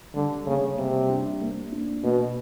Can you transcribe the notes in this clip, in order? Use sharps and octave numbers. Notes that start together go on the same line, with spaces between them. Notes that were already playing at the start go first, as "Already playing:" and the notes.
D3 G3
C#3 A#3
C3 G3
D4
A#3
D4
B2 A#3